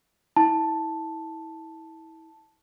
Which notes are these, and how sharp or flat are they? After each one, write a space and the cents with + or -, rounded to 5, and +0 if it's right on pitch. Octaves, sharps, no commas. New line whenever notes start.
E4 -30 A5 +0